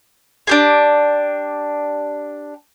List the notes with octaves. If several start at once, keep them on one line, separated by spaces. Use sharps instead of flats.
D4 G4 G#4